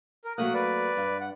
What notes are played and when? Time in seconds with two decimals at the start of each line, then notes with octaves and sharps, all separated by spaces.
0.25 A#4
0.38 F#3 A3 A#3 D#6 F#6
0.54 B4 D5
0.97 G2
1.20 F#5